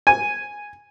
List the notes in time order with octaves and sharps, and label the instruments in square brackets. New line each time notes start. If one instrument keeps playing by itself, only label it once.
[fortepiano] G#5